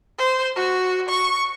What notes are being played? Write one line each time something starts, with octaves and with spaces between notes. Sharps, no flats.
C5
F#4
C#6